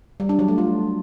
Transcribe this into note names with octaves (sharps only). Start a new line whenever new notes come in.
G3
D4
F#3
A3
F4